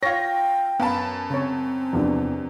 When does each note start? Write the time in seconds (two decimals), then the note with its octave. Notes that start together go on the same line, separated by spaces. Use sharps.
0.03 F4 C#5 G5 A#6
0.80 F#2 B3 F5 A5 B5
1.30 C#3 C4 C#5
1.93 E2 C3 E3 F3 D4